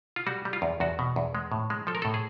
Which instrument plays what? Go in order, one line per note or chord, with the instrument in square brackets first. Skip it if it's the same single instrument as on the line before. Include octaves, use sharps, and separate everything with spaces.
[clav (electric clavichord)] F4
G3 F#4
G3
F4
E2
E2 F#4
B2
E2
G#3
A2
G#3
F3 A4
A#4
A2 A4
G#4